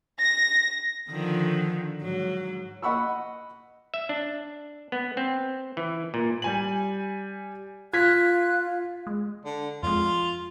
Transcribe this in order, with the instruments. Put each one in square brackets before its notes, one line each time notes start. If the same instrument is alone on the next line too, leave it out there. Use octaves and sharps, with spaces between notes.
[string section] A#6
[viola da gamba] D3 D#3 F3
G#2 F#3
[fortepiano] D#5 F#5 B5 C#6 E6
[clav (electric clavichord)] E5
D4
B3
C4
E3
A#2
[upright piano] G3 G#5 F#7
[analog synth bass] F4 [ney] F5 [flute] F#6 [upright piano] G#6 B6
[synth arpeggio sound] G#3
[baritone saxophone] D3
[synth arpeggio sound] F2 G#3 [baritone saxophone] F4